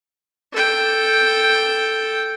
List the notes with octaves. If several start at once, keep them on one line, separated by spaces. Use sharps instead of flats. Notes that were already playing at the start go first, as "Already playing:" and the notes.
A4 G5